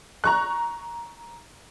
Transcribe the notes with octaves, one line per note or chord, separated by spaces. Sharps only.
A#5 C#6 F#6